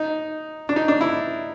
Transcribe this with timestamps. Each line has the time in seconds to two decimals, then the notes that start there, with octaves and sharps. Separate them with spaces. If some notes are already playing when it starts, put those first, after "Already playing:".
Already playing: D#4
0.69 D4
0.76 D#4
0.88 D4
1.01 E4